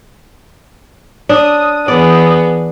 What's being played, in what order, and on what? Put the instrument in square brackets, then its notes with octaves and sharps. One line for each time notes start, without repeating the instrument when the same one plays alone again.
[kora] D4 [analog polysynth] D#6
[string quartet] E3 B3 G#4 [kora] D5